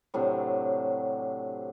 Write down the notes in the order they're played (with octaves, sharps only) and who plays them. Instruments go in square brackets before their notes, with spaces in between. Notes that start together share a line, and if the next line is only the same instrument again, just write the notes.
[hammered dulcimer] A2 C3 F#3 D4